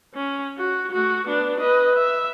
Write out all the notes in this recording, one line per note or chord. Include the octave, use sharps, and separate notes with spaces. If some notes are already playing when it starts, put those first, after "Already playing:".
C#4
F#4
A3 F#4
B3 D4
B4 D#5
E5